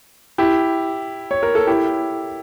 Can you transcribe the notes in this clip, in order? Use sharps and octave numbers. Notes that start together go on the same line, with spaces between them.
E4 G4
C#5
A#4
A4
E4 G4